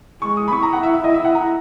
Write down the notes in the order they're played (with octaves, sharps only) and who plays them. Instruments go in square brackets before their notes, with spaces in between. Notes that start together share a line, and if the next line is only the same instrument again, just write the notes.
[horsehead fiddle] G#3 [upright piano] C#6
[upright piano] D#6
B5
[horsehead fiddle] E4 [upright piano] C#6
[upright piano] A#5
F#5
E5
E5
D#5
E5
F#5
A#5